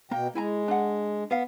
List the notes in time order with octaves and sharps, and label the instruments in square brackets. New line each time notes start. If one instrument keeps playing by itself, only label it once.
[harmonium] B2 G5 [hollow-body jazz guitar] A#3 A#5
[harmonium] G#3 [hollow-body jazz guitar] E4 G#5 A#5
[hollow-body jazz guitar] D4 F#5
B3 F5